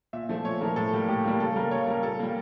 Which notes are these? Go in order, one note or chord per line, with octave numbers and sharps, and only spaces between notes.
A#2 E5
F3 A3
A#2 C#5
F3 A3 A#4
A2 A4
G3 A#3
A2 G4
G3 A#3
C#3 A4
G3 A#3 A#4
C#3 C#5
G3 A#3 A#4
A#2 A4
G3 A#3